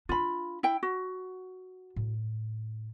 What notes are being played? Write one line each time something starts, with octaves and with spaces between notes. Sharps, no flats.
D4 F4 B5
E4 G5
F#4
A2